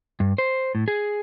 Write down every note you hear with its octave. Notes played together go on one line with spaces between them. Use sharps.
G2
C5
A2
G#4